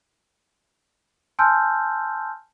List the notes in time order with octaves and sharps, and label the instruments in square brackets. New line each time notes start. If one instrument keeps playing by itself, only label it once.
[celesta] G#5 A5 C6 E6 F6 G6